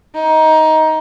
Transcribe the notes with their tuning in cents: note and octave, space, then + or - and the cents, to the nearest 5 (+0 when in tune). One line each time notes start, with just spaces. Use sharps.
D#4 +15